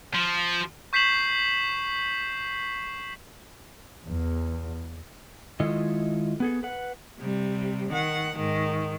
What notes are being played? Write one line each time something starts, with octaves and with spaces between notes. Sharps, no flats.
F3
C#6 G6 B6 C7 E7 F#7
E2
D#3 G#3 E4 F4 A4 D#5
B3 G#4 A4
B4 F#5
C3 G3
D#3 F#5
G#2 D#3